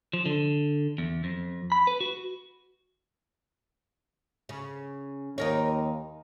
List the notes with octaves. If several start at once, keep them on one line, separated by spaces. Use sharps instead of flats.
F3
D3
E2
F2
B5
B4
F#4
C#3
D#2 D#4 A#4 C#5